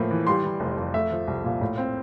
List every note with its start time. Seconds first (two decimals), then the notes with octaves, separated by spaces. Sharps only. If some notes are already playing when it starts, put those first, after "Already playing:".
Already playing: A2 F3 A#3 E4
0.10 E3
0.27 G3 C6
0.43 E3
0.60 F1
0.77 F2
0.94 A3 E5
1.11 F3
1.27 C2
1.44 A#2
1.61 A2
1.78 C4